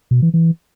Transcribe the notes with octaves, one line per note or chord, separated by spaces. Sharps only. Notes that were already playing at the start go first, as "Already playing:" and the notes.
B2
E3
E3